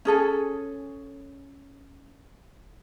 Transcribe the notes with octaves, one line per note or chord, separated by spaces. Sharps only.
C#4 G#4 A4 G#5